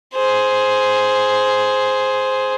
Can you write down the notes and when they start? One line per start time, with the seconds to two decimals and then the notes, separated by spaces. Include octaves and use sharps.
0.14 G#4 C5